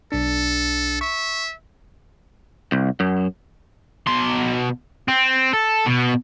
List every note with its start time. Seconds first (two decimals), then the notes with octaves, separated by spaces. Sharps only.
0.12 B1 D4 A4
1.01 E5 C#6
2.72 C2
3.00 F#2
4.07 B2 C6
5.08 C4
5.53 A4
5.86 B2